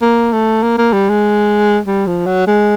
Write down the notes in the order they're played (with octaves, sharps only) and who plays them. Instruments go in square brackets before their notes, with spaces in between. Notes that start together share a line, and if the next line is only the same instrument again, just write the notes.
[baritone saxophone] A#3
A3
A#3
A#3
G3
G#3
G3
F3
F#3
G#3